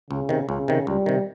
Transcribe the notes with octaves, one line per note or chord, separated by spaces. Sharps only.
C#2 C#3
C3 D#3
C#2 C#3
C3 D#3
C#2 G3
C3 D#3